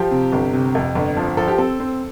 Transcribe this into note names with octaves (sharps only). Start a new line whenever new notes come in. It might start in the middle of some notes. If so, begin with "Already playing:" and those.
Already playing: F3 G4
C3
G1
C3
F2
G1
F3
F3 A4
G4
C4 A4
C4